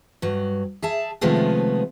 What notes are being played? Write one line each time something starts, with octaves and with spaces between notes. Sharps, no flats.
G2 F#3
G#4 E5 A5
C3 D#3 F3 G#3 A3 B3